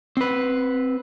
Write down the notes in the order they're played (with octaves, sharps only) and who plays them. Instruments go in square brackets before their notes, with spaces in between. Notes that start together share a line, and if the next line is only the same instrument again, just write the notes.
[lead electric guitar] C4 B4